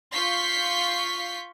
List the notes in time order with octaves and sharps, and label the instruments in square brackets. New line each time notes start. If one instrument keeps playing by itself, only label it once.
[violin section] F4 C#6 G6 B6 C7